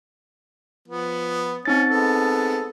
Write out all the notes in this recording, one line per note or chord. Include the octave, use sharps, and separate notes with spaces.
F3 B3
C4 C#4 D#4 A6
G#3 B3 A4